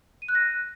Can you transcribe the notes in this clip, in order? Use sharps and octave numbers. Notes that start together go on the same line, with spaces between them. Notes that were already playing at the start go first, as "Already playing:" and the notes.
D#7
F#6
A#6